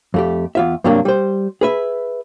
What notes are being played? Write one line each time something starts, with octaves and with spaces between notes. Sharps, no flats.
F2 A3 G4
E2 F4 E5
G2 C3 F#3 A#3 D4
G3 C5
G#4 B4 E5